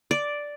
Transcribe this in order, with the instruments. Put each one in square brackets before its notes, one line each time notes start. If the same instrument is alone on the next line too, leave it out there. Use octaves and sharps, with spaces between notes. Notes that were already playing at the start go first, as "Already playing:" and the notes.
[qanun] D5